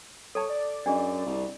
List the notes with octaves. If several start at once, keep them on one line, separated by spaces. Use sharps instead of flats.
A4 C#5 A5
D5
F#2 D4 G#4 D#5
C2